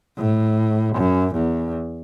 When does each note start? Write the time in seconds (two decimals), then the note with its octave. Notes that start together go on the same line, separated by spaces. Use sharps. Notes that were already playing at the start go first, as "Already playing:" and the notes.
0.18 A2
0.97 F#2
1.36 E2